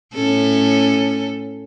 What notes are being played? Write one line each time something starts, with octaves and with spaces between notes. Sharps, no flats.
A2 C#4 A4